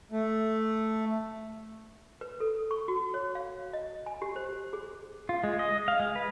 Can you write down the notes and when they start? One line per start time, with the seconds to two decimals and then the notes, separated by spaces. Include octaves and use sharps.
0.12 A3
2.21 B4
2.40 A4
2.71 C#6
2.88 F#4
3.14 C#5
3.35 F5
3.73 D#5
4.06 G#5
4.22 G4
4.36 C5
4.73 G#4
5.29 F4
5.44 G#3
5.59 D#5
5.88 F5
6.00 G#3
6.16 B4